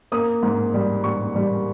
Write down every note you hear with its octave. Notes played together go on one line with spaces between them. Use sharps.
A#3 D#6
G#2
G3
G3 C#6
G3